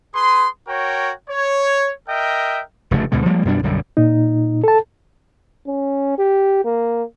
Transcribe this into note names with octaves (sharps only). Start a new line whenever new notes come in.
G#4 B4 C6
F#4 A#4 C#5 G5
C#5
A#4 D#5 E5 G5
F1 G2 C#3 A3
D2 B2 D3 G#3
F3 G3 G#3 A#3
F#2 B2 G3 D4
B1 F#2 D3 G3
A#2 D#4
A4 A5
C#4
G4
A#3